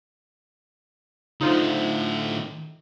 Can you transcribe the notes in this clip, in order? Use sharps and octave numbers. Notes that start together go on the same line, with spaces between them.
A2 D3 D#4 F4 C5